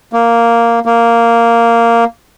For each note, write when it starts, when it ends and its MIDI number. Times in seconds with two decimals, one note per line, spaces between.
0.13 0.80 58
0.86 2.04 58